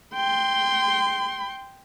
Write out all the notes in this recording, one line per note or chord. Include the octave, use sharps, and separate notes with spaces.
G5 C6